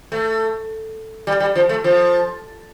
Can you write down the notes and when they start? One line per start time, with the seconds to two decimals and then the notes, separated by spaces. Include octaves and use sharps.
0.12 A3
1.27 G3
1.40 G3
1.56 F3
1.69 A3
1.84 F3